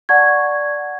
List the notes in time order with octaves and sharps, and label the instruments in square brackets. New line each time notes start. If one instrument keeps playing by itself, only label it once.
[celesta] D5 F#5 A5 C#6 G#6